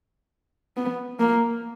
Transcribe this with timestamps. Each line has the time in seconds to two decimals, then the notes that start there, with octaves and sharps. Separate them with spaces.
0.77 B3
1.19 A#3